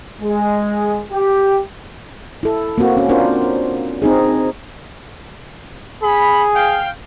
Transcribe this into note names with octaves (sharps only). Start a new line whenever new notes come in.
G#3
G4
E4 A4
A#3 C4 F#4
C#4
C4 D4 F4 A#4 C5
C4 D#4 G#4
G#4 B5
F5 G5